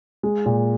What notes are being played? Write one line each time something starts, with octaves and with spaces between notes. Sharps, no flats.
G#3
A#2